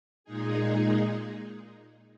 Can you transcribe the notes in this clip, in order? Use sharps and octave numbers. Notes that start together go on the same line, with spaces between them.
A#2 G#3 D#4 G#4